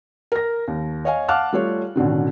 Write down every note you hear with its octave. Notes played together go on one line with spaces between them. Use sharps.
A#4 A#6
D#2
C#5 D#5 F5 G#5
F5 F#5 A5 D6 F6 F#6
G3 A3 F4 G4 C#5
A1 B2 D3 D#3